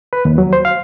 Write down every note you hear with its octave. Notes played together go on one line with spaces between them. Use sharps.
B4
D#2
F#3
C5
F5